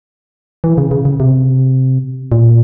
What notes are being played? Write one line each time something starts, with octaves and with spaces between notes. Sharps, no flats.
E3
C#3
C#3
C#3
C3
A#2